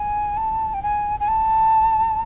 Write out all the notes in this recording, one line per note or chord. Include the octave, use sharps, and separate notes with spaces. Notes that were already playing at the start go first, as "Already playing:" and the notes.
Already playing: G#5
A5
G5
G#5
G#5
A5